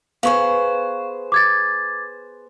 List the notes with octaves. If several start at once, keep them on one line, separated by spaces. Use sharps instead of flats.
B3 G#4 C5 F5 C#6
D6 G#6 A6